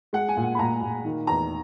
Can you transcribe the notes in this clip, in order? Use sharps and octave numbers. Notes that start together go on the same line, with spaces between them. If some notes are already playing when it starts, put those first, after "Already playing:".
G#3 F#5
G#5
A#2
F#5
B5
A#2 A#5
A#2
D#3
E2 A#5